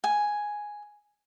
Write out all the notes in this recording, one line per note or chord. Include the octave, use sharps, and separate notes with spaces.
G#5